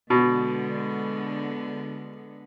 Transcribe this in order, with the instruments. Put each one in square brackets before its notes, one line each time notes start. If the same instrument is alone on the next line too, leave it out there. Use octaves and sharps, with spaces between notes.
[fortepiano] B2 [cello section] D3 G#3 B3